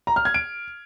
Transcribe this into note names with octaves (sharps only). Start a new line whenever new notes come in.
A#5
F6
G#6
D7